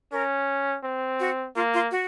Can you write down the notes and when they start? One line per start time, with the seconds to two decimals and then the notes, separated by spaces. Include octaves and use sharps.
0.12 C#4 A#4
0.84 C4
1.20 F#4
1.56 A#3 F4
1.74 F4
1.91 F#4